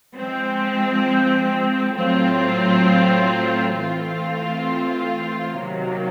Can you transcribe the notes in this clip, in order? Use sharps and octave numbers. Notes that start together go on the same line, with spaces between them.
F3 G#3 C4
A2 F#3 A3 C4 F4
E3 A3 C4 F4
C3 D#3 F#3 A#3